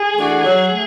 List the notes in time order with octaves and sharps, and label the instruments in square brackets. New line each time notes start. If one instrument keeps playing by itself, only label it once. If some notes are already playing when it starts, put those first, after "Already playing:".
Already playing: [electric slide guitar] G#4
[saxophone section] E3 A3 D4 F#4
F#3
A3